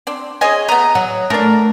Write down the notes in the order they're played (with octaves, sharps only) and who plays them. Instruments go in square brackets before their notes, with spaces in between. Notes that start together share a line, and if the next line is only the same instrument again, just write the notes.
[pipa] C4 D4
[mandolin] G#4 D#5 [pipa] C5 C#5 G#5
[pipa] A3 B3 [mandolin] A#5 D#6
[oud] F#3 [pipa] F#5
[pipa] E3 D4 [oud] A3 [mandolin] A#4